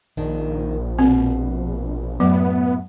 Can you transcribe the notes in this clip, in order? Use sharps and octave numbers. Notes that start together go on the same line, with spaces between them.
A#1 D#3 D4
B2 C4
F#2 A2 F#3 B3